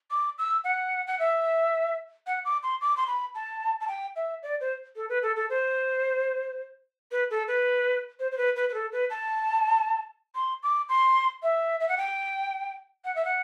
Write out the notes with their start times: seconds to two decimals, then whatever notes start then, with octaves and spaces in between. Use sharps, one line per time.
0.11 D6
0.38 E6
0.64 F#5
1.07 F#5
1.19 E5
2.27 F#5
2.45 D6
2.63 C6
2.81 D6
2.97 C6
3.07 B5
3.35 A5
3.81 A5
3.88 G5
4.16 E5
4.43 D5
4.61 C5
4.96 A4
5.09 B4
5.23 A4
5.36 A4
5.50 C5
7.12 B4
7.30 A4
7.48 B4
8.20 C5
8.32 C5
8.38 B4
8.56 B4
8.69 B4
8.74 A4
8.92 B4
9.10 A5
10.35 C6
10.63 D6
10.89 C6
11.43 E5
11.80 E5
11.89 F#5
11.97 G5
13.05 F#5
13.16 E5
13.25 F#5